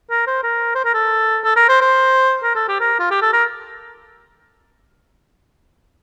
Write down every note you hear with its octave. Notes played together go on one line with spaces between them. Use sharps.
A#4
C5
A#4
C5
A#4
A4
A4
A#4
C5
C5
A#4
A4
G4
A#4
F4
G4
A4
A#4